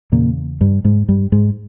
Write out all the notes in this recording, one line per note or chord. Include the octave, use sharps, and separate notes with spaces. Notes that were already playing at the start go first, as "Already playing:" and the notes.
E2 A#2 C#3 A#3
G2 G3
G#2 G#3
G2 G3
G#2 G#3